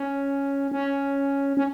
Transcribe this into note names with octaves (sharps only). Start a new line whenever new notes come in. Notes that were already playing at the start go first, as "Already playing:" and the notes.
Already playing: C#4
C#4
C#4